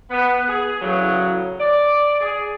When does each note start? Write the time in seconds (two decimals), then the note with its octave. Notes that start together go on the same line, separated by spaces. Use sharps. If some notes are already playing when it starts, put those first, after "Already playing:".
0.11 B3
0.48 G#4
0.81 E2 A2 C#3 F#3
1.60 D5
2.21 G#4